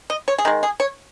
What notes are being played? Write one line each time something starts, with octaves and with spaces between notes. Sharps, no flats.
D#5
C#5
G#4
D#3 G#3 A#4
G#4
C#5